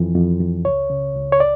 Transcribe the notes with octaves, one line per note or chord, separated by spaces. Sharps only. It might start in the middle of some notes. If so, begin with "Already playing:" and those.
Already playing: F2 E3
F2
F2
C#2 C#5
C#3
C#2
C#5
D5